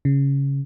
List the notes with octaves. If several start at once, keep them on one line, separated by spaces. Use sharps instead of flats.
C#3